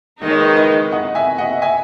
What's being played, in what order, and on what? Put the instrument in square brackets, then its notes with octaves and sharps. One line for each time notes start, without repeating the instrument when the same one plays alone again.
[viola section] D#3 G#3 D#4 [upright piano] D#5
[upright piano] C#5
B4 D#5
B4 D#5
D#5 F#5
E5 G#5
D#5 F#5
E5 G#5